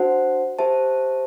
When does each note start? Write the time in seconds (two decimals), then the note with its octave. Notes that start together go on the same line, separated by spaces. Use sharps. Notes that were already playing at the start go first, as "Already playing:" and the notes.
Already playing: D4 F#4 C5 F#5 A5
0.59 G4 C5 E5 A5